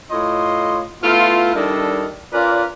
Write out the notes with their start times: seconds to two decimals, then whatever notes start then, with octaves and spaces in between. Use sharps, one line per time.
0.11 A2 F4 C#5 D#5 C6
1.03 A3 B3 E4 F4
1.54 D#3 G3 D4 E4 A4 D#5
2.32 C#4 F4 A#4 B4 D5